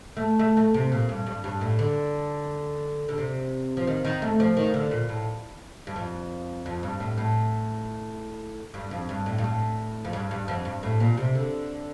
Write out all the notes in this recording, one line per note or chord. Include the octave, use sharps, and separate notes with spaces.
A3
A3
A3
C3
A#2
G2
G2
G2
A2
D3
D3
C3
F3
D#3
D#3
A3
F3
D#3
D3
A#2
A2
G2
F2
F2
G2
A2
A2
G2
F2
G2
A2
G2
A2
F2
G2
G2
F2
G2
A2
A#2
C3
D3